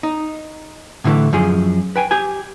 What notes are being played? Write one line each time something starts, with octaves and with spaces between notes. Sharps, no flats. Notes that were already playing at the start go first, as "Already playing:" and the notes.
D#4
A2 D3 E3 G3 A3
F#2 F3 G#4
B4 G5 G#5
G4 G#5